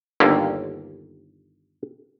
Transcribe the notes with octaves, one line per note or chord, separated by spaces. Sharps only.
G1 D#2 D3 A#3